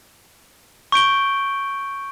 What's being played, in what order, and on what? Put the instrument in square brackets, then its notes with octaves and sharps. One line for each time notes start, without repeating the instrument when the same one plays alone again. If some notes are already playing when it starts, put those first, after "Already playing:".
[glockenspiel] C#6 G6 D7 G7